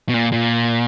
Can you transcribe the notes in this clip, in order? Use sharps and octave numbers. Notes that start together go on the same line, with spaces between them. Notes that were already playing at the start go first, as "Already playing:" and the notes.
B2
A#2
A#2